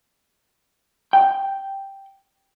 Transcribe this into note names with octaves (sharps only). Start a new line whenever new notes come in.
G5